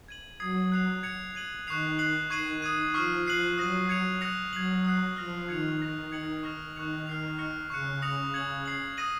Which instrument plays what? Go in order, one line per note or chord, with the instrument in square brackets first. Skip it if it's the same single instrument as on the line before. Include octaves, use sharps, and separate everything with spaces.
[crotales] G#6 D#7 F#7
[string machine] F#3 [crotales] D#6 G#6 C7
[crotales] F#6 C7 F7
G#6 C#7 F7
G#6 D#7 F#7
[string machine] D#3 [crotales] C#6 F#6 C7 F7
[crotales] F#6 C7 F#7
[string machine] D#3 [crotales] C#6 G#6 C7 D#7 F#7
[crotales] D#6 G#6 D#7
[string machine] F3 [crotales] C#6 F6 C7
[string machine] F3 [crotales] F#6 C7 D#7 F#7
[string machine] F#3 [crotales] D#6 A#6 D#7 F#7
[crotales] G#6 C#7 F7
D#6 F#6 A#6 C#7 F7
[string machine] F#3 [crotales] G#6 C7 F#7
[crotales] D#6 F#6 C7
[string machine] F3 [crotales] F6 A#6 F7
[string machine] D#3 [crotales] G#6 C#7 F7
[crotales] F#6 A#6 F7
G#6 C#7 F#7
C#6 F6 A#6 F7
[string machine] D#3 [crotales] C#6 F#6 C#7 F7
[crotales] F6 C7 F7
C#6 F6 A#6 C#7
[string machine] C#3 [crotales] C#6 F#6 C#7
[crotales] D#6 A#6 C#7 F7
G#6 C#7 F#7
G#6 C7 F#7
D#6 A#6 D#7 F#7